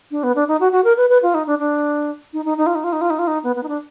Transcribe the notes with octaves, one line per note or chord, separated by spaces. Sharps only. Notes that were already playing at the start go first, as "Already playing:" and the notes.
D4
B3
D4
D#4
F#4
F#4
A#4
B4
B4
F4
D#4
D4
D4
D#4
D#4
D#4
F4
D#4
F4
D#4
F4
D#4
F4
D#4
B3
B3
D#4
D4